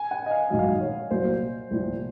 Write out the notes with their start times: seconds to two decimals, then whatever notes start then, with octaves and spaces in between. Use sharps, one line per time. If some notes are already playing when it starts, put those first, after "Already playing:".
Already playing: G#5
0.11 F#5
0.26 D#5
0.31 F5
0.50 A#1 G#2 D#3 F#3 D#5
0.59 F5
0.67 D#5
0.81 C#5
1.11 C2 A#2 F#3 A#3 C5
1.71 C2 A#2 F3